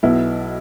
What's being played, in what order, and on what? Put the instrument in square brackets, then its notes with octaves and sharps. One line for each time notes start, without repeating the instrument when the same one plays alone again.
[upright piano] B1 B2 B3 E4